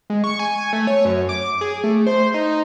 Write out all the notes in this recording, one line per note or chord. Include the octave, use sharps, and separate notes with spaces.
G#3
C#6
G#5
A3
C#5
F#2
D6
G#4
A3
C5
D#4